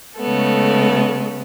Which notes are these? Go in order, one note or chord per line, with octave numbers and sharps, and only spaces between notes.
C#3 G#3 A3 B3 A4